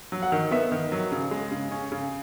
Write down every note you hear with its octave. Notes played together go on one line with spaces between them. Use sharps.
F#3
F#5
D#3
B3 E5
D#3
F#3
C#3
G#3
C#3
C#4
C#3